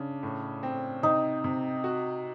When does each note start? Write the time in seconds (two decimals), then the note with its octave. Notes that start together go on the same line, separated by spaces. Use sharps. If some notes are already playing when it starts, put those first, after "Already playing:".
Already playing: C#3 D4
0.23 A2
0.63 C4
1.03 C3 D#4
1.44 C3
1.84 F#4